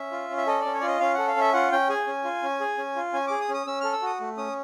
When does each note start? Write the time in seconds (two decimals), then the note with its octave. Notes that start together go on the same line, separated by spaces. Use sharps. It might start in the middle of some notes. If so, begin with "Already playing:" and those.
Already playing: C#4 E5
0.12 F4
0.30 C#4
0.37 E5
0.47 A4 D#5
0.61 C#4 D5
0.74 C#5
0.80 D5
0.83 F4 D#5
1.00 C#4 F5
1.14 A4 F#5
1.28 F5
1.37 C#4 E5
1.53 F4 F#5
1.72 C#4 G5
1.89 G#4 G#5
2.07 C#4
2.24 F4
2.43 C#4
2.60 G#4
2.78 C#4
2.96 F4
3.13 C#4 G#5
3.27 G#4 D6
3.41 D#6
3.49 C#4
3.54 D#6
3.67 C#4 E6
3.81 A4 F6
3.93 E6
4.02 F#4 D#6
4.20 A3
4.37 C#4 D#6